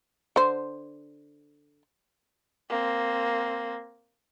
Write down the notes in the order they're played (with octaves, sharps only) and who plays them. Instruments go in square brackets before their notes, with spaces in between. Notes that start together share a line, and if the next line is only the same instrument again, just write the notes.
[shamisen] D3 C5
[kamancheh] A#3 C4